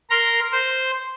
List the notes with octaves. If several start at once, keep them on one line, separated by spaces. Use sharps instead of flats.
A#4 A#5 C6
C5